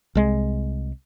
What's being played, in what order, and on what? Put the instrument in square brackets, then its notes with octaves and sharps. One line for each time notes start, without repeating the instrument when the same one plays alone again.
[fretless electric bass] C2 G#3